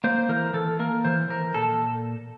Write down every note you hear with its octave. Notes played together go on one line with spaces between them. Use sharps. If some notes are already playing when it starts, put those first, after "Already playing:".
A#3 C5
E3 A#4
E3 A4
A#3 A#4
E3 C5
E3 A#4
A#2 A4